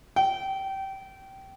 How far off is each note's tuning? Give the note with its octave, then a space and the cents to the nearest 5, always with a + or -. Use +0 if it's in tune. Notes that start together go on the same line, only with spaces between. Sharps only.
G5 -20